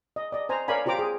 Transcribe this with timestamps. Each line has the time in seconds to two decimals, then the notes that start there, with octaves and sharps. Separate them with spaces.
0.16 D#5
0.32 D5 D#5
0.49 C5 G#5 A#5
0.68 A#4 C#5 D5 F5 G#5 B5
0.86 F4 G4 C5 A#5 D6
0.99 G#4